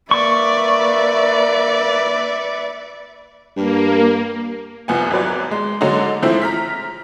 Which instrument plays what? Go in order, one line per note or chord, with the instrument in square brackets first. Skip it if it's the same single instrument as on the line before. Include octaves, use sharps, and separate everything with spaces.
[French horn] A#3 [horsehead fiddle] B4 E5 [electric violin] D5 [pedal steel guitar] C#6
[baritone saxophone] G2 [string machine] A#3
[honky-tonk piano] C2 F3 B3 G#5
G#1 F#3 B4 D5
G#3
D3 F#3 G#3 A#3 C#4 D#4
E3 F3 G#3 A3 C4 E4
A#5 F6 B6